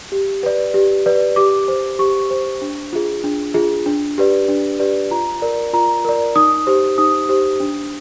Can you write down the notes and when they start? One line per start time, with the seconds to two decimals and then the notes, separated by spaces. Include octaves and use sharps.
0.12 G4
0.43 B4 D5
0.74 G4
1.06 B4 D5
1.36 G4 D6
1.68 C5
1.99 G4 C#6
2.30 C5
2.61 D4
2.93 F4 G#4
3.24 D4
3.54 F4 G#4
3.86 D4
4.18 G4 B4 D5
4.48 D4
4.79 G4 B4 D5
5.11 F4 A#5
5.42 A#4 D5
5.73 F4 A#5
6.05 A#4 D5
6.36 D#4 D#6
6.67 G4 C5
6.98 D#4 D#6
7.29 G4 C5
7.60 D4